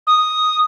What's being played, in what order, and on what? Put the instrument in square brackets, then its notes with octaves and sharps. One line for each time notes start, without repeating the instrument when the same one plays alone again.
[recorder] D#6